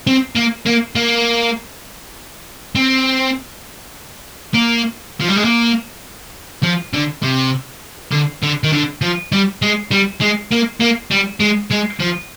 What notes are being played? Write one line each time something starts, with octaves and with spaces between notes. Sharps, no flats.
C4
A#3
A#3
A#3
C4
A#3
F3
G3
G#3
A#3
F3
D3
C3
D3
D3
D#3
D3
F3
G3
G#3
G3
G#3
A#3
A#3
G3
G#3
G#3
F3